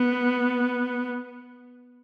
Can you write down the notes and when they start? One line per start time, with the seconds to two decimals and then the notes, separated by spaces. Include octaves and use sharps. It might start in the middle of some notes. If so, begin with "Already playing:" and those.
Already playing: B3